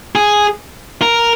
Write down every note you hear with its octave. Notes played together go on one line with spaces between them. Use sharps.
G#4
A#4